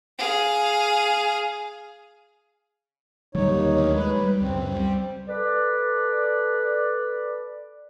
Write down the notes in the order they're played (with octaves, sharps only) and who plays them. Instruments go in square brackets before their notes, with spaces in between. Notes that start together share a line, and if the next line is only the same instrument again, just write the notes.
[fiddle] G#4 F5
[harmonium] D#2 D#4 C#5 [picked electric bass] D3 F#3 G3
[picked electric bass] D2
[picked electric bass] G#3 [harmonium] B4
[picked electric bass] G3
[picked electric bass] C#2 F#2 C#3 [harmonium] C4
[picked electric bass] G3 [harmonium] C4
[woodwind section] A4 B4 D5